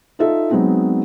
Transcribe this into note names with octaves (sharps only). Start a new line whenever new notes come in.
D#4 F4 A4 E5
F#3 G#3 B3 C4 D#4